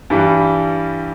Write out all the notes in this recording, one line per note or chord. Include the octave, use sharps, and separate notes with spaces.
G2 E3 G3